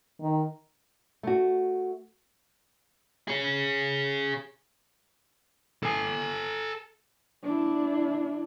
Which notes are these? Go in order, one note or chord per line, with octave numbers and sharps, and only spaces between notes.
D#3
A3 F#4
G#4 C#5
A4 G#5
D4 E4